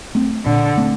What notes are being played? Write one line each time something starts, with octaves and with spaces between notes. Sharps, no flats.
A3 C4
A#2 D3
A3 C4